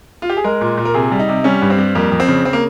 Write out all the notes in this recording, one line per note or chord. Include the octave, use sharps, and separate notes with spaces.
F4
G4
G#4
G#3 A#4
A#2
A#2
A#4
C3 G#4
G3
D#4
C3
G3 C#4
G2
C4
G3
F2 A#3
F2
C4
C#3
C4
A#3